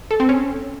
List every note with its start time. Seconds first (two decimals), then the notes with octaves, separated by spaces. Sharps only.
0.11 A4
0.20 C4
0.29 C#4